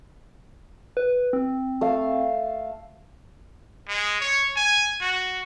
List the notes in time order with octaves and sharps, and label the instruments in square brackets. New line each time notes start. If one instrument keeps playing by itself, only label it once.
[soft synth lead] B4
C4
[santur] A3 F5
[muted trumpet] G#3
C#5
G#5
F#4